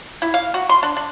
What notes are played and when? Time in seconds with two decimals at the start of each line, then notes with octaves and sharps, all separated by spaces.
0.22 E4
0.34 F5
0.54 F#4
0.69 C6
0.83 D4
0.97 D4